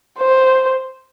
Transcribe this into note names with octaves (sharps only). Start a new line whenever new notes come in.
C5